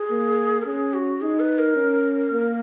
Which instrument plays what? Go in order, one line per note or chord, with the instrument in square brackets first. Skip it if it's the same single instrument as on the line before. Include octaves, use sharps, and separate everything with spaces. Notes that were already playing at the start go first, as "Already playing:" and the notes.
Already playing: [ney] G#4
[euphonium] A#3
[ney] A#4
[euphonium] C#4 [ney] G#4
[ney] F#4
[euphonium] D#4 [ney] G#4
[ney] B4
A#4
[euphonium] C#4
A#3